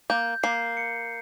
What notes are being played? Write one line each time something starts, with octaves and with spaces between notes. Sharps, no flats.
A#3 G6
A#3 C7
C#7